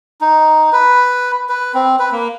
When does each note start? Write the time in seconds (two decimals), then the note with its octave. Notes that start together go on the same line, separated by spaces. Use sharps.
0.21 D#4
0.73 B4
1.49 B4
1.74 C4
1.99 B4
2.12 A#3